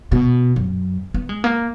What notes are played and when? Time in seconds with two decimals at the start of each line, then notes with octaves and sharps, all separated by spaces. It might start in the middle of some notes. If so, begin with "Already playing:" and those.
0.12 B2
0.56 F#2
1.14 B3
1.29 G#3
1.44 A#3